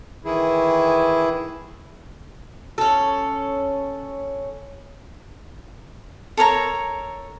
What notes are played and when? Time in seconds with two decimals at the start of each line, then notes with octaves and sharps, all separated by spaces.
0.25 D#3 E3 E4 G#4
2.78 C#4 A4
6.37 A4 A#4 C#5 A#5